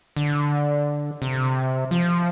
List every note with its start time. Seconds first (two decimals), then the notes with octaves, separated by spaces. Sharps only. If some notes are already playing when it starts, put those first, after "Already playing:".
0.16 D3
1.22 C3
1.91 F3